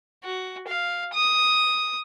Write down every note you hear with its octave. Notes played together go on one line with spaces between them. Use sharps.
F#4
F5
D#6